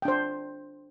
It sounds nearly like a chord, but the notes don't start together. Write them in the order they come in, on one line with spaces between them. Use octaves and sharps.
G5 D4 C5